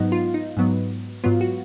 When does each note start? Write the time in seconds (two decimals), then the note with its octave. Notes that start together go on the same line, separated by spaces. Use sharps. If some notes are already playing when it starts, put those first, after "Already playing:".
Already playing: G#2 F#3 B3 D#4
0.12 F4
0.34 D#4
0.57 G#2 F#3 B3
1.24 G#2 F#3 B3 F4
1.41 F#4